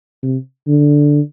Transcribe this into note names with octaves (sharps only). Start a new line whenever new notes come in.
C3
D3